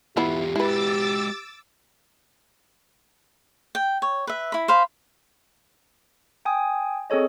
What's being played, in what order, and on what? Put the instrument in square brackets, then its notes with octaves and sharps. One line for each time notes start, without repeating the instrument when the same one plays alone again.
[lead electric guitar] E2 F4 [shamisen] E3 B3 E4 [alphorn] G4
[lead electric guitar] G#3 F#4 [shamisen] E4 B4 [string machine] D6 E6 A6
[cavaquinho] G5
C#5
B4 E5
E4 B5
C5 F5 B5
[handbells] G5 G#5 D#6
C4 G#4 A4 C#5 D#5